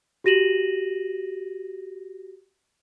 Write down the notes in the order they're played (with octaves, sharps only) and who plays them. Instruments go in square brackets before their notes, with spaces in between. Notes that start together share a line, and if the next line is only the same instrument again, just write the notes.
[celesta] F#4 G4 A#6 D#7 E7 F#7